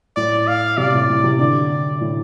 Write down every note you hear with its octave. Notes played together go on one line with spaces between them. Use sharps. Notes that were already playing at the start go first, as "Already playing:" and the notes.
A2 D5
F5
C3 D5
A2
A2
C3
D3 D5
A2